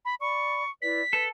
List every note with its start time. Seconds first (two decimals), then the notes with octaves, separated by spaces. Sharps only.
0.05 B5
0.21 D5 B5 C#6
0.82 E4 B4 D5 B6
1.13 A4 B4